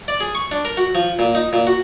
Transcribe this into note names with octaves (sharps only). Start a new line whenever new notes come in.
D5
G#4
C#6
D4
A#4
F#4
F3
A#2
D#4
A#2
F#4